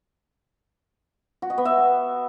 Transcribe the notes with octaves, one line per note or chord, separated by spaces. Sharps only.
F#4
D#5
B3
E5